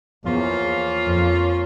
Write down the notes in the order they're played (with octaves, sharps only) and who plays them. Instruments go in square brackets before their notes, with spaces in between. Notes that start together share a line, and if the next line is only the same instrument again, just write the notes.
[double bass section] E2 [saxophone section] F3 A#3 C#4 F4
[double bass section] F2